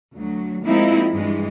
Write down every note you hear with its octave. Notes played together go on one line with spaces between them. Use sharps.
D2 F#3
F3 G#3 A#3 C4 D#4 E4
G2 E3 G#3